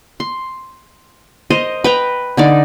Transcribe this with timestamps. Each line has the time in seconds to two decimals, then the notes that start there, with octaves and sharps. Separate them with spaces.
0.20 C6
1.50 A#4 C5 D#5
1.84 B4 G5 A#5
2.37 D3 D#4 D5